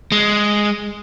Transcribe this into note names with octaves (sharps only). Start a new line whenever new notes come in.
G#3